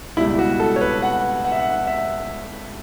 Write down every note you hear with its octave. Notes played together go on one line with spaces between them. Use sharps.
C#2 B2 G3 E4
F#4
A4
C#5
B4
F#5
F#5
E5
F#5
E5